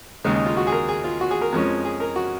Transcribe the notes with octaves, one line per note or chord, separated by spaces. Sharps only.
D#2 C#3 G#3 D#4
D#4
F4
F#4
G#4
A#4
G#4
F4
F#4
G#4
A#4
F2 F3 G#3 C#4
G#4
A#4
F#4